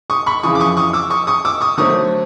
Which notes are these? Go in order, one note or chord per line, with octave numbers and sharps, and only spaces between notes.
C#6 D#6
B5 C#6
F2 C#3 E3 C#6 D#6
D6
C#6 D#6
C#6 D#6
D6 E6
C#6 D#6
C#6 D#6
D6 E6
C#6 D#6
D3 F#3 A3 C4 C#6 D#6